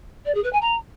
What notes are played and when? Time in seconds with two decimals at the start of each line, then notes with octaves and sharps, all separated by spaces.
0.25 D5
0.34 G#4
0.43 B4
0.52 G#5
0.61 A#5